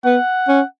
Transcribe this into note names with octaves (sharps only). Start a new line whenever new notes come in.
B3 F#5
C#4